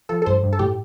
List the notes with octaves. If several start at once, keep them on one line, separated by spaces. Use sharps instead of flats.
F3 A4
A4
G2 C5
G2
A4
A2 G4